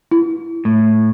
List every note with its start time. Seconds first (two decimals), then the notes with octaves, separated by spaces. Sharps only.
0.12 E4
0.65 A2